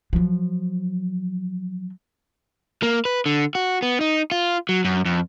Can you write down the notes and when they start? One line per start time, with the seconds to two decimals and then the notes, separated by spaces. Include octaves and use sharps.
0.13 F3 F#3
2.83 A#3
3.05 B4
3.26 D3
3.55 F#4
3.82 B3
4.01 D#4
4.32 F4
4.69 F#3
4.85 F#2
5.05 F2